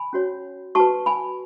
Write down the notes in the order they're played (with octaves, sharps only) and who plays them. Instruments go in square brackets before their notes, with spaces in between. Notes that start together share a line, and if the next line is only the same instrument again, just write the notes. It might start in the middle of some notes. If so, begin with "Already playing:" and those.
Already playing: [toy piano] G#5 B5
C#4 F#4 C#5
F#4 B4 A5 C#6
G#5 B5